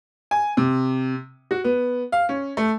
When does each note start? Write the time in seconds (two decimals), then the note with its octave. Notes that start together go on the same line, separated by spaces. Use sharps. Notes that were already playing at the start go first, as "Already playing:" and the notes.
0.31 G#5
0.57 C3
1.51 F#4
1.64 B3
2.12 F5
2.29 C#4
2.57 A3